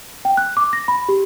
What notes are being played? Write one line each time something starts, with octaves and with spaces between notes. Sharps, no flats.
G5
F#6
D6
A#6
B5
G4